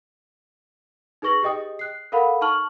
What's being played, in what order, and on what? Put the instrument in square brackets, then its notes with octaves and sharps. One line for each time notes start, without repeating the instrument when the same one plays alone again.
[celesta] D#4 G#4 B4 C#6 A#6 F#7
G4 G#4 D#5 G5 D#6
F#6 C7
A4 A#4 F5 F#5 B5
D#4 A5 C#6 F6 F#7